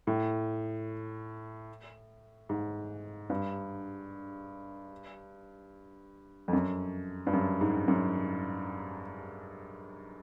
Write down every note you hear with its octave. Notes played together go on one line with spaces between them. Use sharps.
A2
G#2
G2
F2
F#2
G2
F#2
G#2
F#2